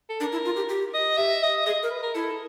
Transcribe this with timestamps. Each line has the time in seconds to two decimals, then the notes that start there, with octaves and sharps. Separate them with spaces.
0.09 A4
0.20 D4 A#4
0.32 E4
0.45 F4
0.57 G4
0.69 G4
0.94 D#5
1.17 G4 E5
1.43 D#5
1.66 G#4 D#5
1.83 A#4
1.90 B4
2.02 A#4
2.14 E4 A4